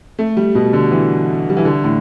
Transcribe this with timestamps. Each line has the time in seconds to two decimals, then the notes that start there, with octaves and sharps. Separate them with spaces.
0.19 A3
0.37 G3
0.55 B2
0.73 D3
0.91 E3
1.49 G3
1.57 E3
1.65 D3
1.84 A2